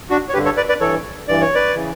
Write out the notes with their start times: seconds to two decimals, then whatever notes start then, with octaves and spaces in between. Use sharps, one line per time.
0.10 D4 F#4
0.29 C#5
0.33 G2 D3 G4 B4
0.45 A4 C#5
0.57 B4 D5
0.69 B4 D5
0.80 G2 E3 A4 C#5
1.27 G2 E3 D5
1.41 C#5
1.55 B4 D5
1.75 C#3 E3